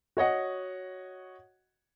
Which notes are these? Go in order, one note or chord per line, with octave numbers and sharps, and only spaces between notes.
F#4 C#5 D#5 F#5